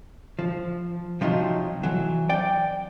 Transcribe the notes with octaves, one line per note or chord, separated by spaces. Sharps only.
F3
C3 F3 F#3 D#4
E3 F#3
D5 G5